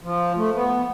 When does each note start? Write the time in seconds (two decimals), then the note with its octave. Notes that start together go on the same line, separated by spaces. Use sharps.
0.03 F3
0.36 A3
0.54 B3